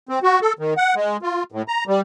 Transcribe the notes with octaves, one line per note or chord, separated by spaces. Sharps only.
C4
F#4
A4
D#3
F#5
G#3
F4
A2
A#5
G3